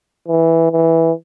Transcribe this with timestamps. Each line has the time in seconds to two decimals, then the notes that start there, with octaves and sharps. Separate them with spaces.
0.28 E3
0.72 E3